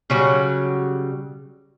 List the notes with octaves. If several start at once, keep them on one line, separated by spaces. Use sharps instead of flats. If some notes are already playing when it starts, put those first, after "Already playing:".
C#3 F#3 G3